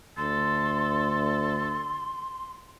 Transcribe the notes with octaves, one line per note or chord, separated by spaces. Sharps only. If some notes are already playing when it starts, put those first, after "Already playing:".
D2 A4 C6